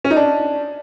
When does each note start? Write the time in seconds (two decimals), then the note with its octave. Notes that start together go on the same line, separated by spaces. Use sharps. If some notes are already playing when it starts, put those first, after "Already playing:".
0.04 C#4
0.10 D#4
0.16 D4